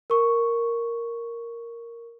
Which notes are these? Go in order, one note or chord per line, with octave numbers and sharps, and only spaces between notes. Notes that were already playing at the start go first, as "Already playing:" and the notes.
A#4 C#6